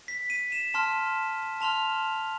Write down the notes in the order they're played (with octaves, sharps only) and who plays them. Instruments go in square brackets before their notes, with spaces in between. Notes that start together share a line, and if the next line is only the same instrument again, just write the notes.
[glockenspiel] B6
D#7
E7
A5 C6 F6 E7
A5 C6 F6 F7